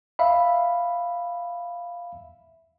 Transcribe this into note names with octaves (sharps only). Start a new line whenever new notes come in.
E5 F5 B5